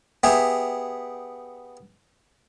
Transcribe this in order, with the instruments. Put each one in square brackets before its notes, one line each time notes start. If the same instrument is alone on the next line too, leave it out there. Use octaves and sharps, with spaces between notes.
[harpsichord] B3 G4 G#4 E5